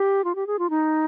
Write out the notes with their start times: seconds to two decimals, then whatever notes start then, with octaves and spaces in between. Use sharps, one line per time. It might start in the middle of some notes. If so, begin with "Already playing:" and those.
Already playing: G4
0.24 F4
0.35 G4
0.47 G#4
0.59 F4
0.70 D#4